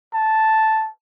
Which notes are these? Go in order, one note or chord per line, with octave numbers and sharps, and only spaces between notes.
A5